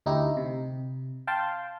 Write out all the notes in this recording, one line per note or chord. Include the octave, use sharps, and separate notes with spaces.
D2 D#4 E4 G4
C3
F5 G5 A5 C6